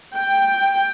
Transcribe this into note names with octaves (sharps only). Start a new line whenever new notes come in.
G5